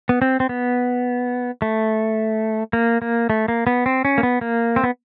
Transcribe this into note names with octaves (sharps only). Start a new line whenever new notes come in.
B3
C4
C4
B3
A3
A#3
A#3
A3
A#3
B3
C4
C#4
A#3
B3
A#3
C4
B3